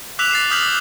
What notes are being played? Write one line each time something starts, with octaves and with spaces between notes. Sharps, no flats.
D6 E6 F#6 B6 E7 F7
A6 C7 E7
D#6 F6 G6 B6 F#7
D6